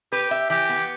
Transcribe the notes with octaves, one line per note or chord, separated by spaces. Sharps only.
G4 B4
E5
E3 G4
B3